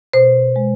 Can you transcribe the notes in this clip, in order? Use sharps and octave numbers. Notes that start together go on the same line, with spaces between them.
B2 C5
G#3